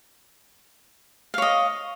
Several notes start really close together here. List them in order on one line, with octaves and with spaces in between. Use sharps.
F5 C#5 D#5